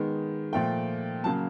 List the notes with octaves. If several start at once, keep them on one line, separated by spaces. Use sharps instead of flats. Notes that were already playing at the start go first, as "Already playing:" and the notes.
Already playing: D#3 G#3 B3
A#2 F3 A3 G5
C#3 F#3 A#3 A5